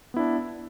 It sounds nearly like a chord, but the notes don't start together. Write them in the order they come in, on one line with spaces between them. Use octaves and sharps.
B3 E4 D4